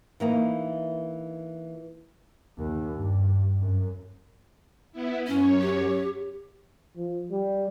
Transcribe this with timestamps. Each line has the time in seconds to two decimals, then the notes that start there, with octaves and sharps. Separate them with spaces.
0.20 E3 A#3 D#4
2.58 D#2
2.92 G2
3.60 F#2
4.92 B3 E4
5.27 F#2 C#4 C#5
5.61 G4
6.96 F3
7.31 G3